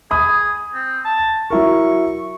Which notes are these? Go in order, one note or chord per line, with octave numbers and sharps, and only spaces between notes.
G#4 B5 D#6
C4
A5
F#3 E4 A#4 C#6